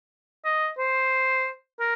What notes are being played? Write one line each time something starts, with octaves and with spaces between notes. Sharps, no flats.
D#5
C5
A#4